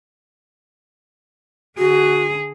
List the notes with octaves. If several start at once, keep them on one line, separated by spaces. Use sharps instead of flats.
D3 F#4 G#4